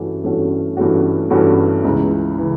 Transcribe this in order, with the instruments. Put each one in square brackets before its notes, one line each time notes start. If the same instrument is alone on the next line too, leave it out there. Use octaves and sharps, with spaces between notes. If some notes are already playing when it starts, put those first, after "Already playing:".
Already playing: [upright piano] G2 E3 A3 C#4 F#4
G2 E3 A3 C#4 F#4
G2 E3 A3 C#4 F#4
G2 E3 A3 C#4 F#4
C#2 C#3 E3
C#3 E3